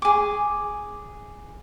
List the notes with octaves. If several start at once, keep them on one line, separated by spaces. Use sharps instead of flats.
G#4 D6